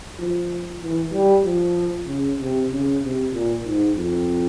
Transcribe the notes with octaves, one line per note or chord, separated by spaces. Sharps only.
F3
E3
G3
F3
C#3
C3
C#3
C3
A#2
G#2
F2